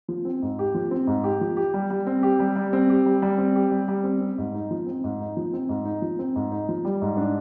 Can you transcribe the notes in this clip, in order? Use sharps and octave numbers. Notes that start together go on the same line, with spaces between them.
F3
C4
G#2
G4
F3
C4
G#2
G4
F3
G4
G3
G3
C4
G4
G3
G3
C4
G4
G3
G3
C4
G4
G3
G3
C4
C4
G#2
D#4
F3
C4
G#2
D#4
F3
C4
G#2
D#4
F3
C4
G#2
D#4
F3
G3
G#2
D4